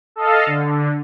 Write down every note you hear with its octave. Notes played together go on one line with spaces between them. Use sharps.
A4 D#5 F5
D3